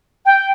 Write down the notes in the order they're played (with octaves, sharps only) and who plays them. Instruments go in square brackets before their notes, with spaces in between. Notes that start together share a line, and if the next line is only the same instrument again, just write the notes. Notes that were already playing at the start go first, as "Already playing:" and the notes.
[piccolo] G5